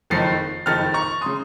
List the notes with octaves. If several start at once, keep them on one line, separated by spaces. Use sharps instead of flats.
F#1 F2 D#3 A6 C7
F#1 F2 D#3 F6 A6
A#5 C#6
C#3 C6 D#6